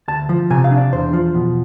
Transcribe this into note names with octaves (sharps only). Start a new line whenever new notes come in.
D2 A5
F3
C3 G#5
F5
D4
D5
E2 C5
F3
B2